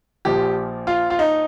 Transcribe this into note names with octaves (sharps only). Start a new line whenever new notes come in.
A#1 A#2 F3 G4
F4
F4
D#4